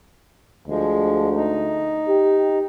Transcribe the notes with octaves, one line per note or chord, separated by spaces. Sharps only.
D2 F3 G#3
D#4
G4